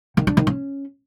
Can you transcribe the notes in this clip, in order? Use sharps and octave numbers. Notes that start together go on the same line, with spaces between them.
D#3
D4
D#3
C#4